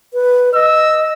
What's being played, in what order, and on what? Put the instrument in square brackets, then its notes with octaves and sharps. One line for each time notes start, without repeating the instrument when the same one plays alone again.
[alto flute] B4
[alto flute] D#5 [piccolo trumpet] E6